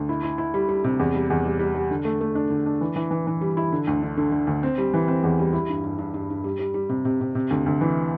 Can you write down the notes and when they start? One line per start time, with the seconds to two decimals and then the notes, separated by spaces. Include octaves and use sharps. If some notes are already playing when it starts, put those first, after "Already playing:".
Already playing: D2
0.09 E4
0.23 E4
0.38 E4
0.54 G3
0.69 G3
0.84 C3
0.99 E2
1.14 G3
1.30 E2
1.45 G3
1.59 G3
1.75 G3
1.91 D3
2.05 A3
2.21 A3
2.35 D4
2.50 D3
2.66 D4
2.81 E3
2.96 E3
3.11 E3
3.27 E3
3.41 G3
3.57 E4
3.72 D3
3.87 D2
4.02 D3
4.17 D3
4.32 D3
4.47 D2
4.63 C4
4.78 G3
4.94 E3
5.08 C4
5.24 E2
5.39 G3
5.53 E4
5.69 G2
5.84 G2
5.98 G2
6.14 G2
6.30 G2
6.44 G3
6.59 G3
6.74 G3
6.89 C3
7.05 C3
7.21 C3
7.35 C3
7.51 D2
7.66 D2
7.81 E3